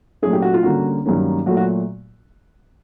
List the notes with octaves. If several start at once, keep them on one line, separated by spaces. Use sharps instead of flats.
A#2 F#3 A3 C#4 G#4
G4
F#4
F4
D3 G3 A#3 C#4 F#4
G2 D#3 F#3 A#3 C#4
A#2 F#3 A3 F#4
F#4